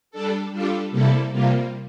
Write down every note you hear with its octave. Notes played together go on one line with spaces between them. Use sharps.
G3 D4 A4
G3 D4 F4 A4
C3 G3 A#3 E4 A4
C3 G3 A#3 F4